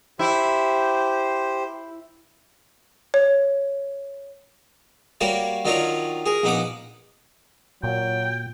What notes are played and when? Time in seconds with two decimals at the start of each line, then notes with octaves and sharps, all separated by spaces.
0.19 E4 G4 C5
3.14 C#5
5.21 G3 A#3 F#4 C#5 D5
5.65 D#3 F#3 D4 F4 A#4 C#5
6.26 G#4 A#4
6.43 A#1 B3 D#4 F#5 D6 D#6
7.83 A#2 F#3 G5